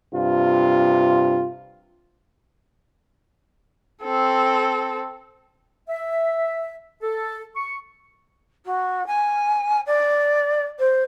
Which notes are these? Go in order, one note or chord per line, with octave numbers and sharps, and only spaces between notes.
G2 C3 F4
C4 A4
E5
A4
C#6
F#4
G#5
D5
C5